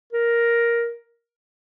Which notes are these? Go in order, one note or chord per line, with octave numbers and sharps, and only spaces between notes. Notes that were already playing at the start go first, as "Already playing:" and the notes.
A#4